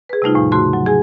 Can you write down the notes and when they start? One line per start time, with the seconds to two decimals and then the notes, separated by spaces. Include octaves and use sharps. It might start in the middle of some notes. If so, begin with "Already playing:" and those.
0.09 G#4 B4
0.22 C3 G3 A3 D#4 F4
0.35 E2 A2 F3
0.52 C#3 A3 F#4 C6
0.73 F#3
0.86 G#4 G#5